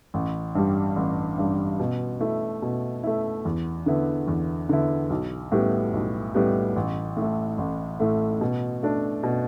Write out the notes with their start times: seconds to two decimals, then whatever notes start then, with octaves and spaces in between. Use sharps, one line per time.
0.14 A1
0.55 G2 G3
0.96 A1
1.38 G2 G3
1.80 B2
2.20 A3 E4
2.62 B2
3.03 A3 E4
3.45 E2
3.86 D3 B3 E4
4.27 E2
4.69 D3 B3 E4
5.10 B1
5.52 A2 G3 B3 G4
5.93 B1
6.34 A2 G3 B3 G4
6.76 A1
7.17 A2 A3
7.58 A1
8.00 A2 A3
8.41 B2
8.83 A3 D4
9.23 B2